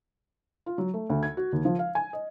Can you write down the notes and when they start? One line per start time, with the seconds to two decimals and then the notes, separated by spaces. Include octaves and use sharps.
0.66 F4
0.78 F#3
0.94 A3
1.10 D2
1.23 G#6
1.37 F#4
1.52 D#2
1.65 F3
1.79 F5
1.95 G#5
2.13 D#5